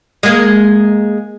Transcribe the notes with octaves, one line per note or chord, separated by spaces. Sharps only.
G#3 A#3